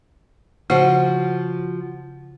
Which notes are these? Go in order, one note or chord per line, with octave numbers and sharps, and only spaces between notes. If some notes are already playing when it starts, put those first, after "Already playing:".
C#3 F3 F#4 C5